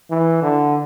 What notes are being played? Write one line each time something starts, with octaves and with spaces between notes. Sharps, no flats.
E3
D3